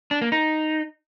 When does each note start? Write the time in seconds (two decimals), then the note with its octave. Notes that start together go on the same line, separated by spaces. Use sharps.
0.11 D4
0.21 A#3
0.32 D#4